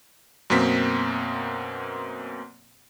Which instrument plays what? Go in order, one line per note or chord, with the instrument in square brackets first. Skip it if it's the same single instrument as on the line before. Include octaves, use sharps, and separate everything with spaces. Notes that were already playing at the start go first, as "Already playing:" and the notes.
[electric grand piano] F#2 B2 A#3 C4 B6